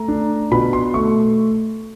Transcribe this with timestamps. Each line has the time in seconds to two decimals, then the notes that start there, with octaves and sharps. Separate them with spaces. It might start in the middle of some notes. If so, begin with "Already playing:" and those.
Already playing: A3 A#5
0.08 D4
0.52 B2 B5
0.73 C6
0.94 A3 C#6